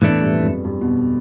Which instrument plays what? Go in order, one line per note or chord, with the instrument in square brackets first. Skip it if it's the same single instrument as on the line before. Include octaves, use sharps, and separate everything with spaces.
[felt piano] E2 [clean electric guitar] A2 E3 A3 D4
[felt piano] G2
F2
G2
G2
B2